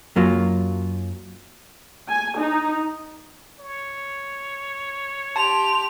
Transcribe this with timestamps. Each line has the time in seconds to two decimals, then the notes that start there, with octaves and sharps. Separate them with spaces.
0.16 F#2 F#3 A#3 F4
2.09 G#5
2.40 D#4
3.60 C#5
5.36 G4 A5 C6 F7